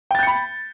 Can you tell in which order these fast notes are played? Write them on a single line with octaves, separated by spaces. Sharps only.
G5 A6 G6 C#7 B5